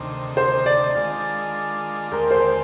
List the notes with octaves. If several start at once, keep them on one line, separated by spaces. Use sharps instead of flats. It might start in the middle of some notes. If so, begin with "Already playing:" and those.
Already playing: D2 C3 D#3
C5
D5
D#3 G#3 D4 F4
D#2 D3 G#3 C4 G4 A#4
C5